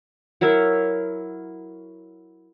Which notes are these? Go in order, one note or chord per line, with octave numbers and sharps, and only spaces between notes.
F#3 E4 A#4 E5